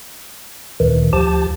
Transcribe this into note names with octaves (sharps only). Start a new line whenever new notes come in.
D2 A#2 D#3 E3
D2 F3 G4 A5